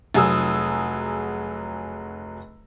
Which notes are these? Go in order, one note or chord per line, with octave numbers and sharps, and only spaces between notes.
F1 F#3 G#4 D#6 E6